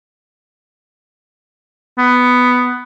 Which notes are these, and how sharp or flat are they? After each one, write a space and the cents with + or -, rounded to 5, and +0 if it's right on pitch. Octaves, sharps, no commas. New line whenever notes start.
B3 +5